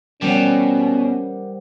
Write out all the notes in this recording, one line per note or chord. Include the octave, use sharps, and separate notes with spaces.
B2 G3 C#4 A#4 C5 F#5